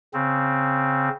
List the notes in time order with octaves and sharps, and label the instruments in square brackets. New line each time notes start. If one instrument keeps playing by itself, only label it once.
[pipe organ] C#3 C4